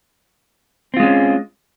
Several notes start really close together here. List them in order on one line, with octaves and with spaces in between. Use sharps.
C4 F4 G#3 C#4